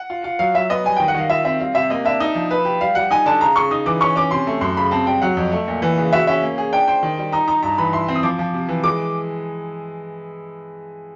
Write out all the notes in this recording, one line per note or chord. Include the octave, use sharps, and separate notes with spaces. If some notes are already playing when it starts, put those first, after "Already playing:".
Already playing: F#5
F4
F4
F#3 F5
F#3 E5
B3 D#5
G3 G#5
D#3 G5
F#5
D#3 F5
F4 E5
C4 E5
G3 F5
C3 E5
A#3 D#5
D4 E5
D#4
F3
B4
G4
G3 F5
G3 F#5
D#4 G#5
D3 A5
C#3 A#5
C#3 C#6
D#4 D#6
E3 D6
C#4 C#6
C#4 D6
C3 C6
A3
F#2 C6
C#3 B5
C4 A5
G3 G5
F#3 F#5
F2
A3
A#2
E3
C#3
F#4 E5
C#4 E5
A#3
G#4
D4 G5
C5 G5
D#3
G3
D#4 A#5
D#4 A#5
G2 A#5
E3 B5
E4 C6
C4
D#6
F3 D6
F3
C3
E3
G#3 D6